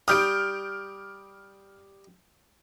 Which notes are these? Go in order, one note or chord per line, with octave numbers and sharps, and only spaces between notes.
G3 D#6 F6 G6 D7